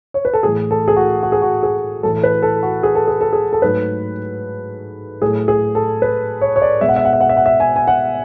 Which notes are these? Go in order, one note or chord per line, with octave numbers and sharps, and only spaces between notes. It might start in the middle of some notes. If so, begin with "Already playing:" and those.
C#5
B4
A4
A2 E3 A3 G#4
A4
G#4
F#4
F#4
G#4
F#4
G#4
A2 E3 A3 A4
B4
A4
F#4
G#4
A4
G#4
A4
G#4
A4
G#2 F#3 A3 B4
A2 F#3 A3 G#4
G#4
A4
B4
C#5
C#5
D5
B2 G#3 E5
F#5
E5
F#5
E5
F#5
E5
F#5
E5
G#5
G#5
F#5